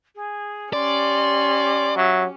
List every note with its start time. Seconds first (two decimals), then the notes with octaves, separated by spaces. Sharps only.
0.15 G#4
0.73 C#4 G4 D5 C6
1.96 F#3 E5